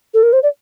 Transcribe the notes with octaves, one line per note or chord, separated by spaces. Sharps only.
A4
A#4
C5
D5